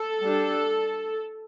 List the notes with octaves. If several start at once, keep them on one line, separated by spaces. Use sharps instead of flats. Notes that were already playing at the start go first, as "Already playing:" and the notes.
Already playing: A4
G3 D4